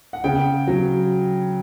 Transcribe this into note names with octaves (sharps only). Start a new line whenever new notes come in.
F#5
C#3 G5
F#3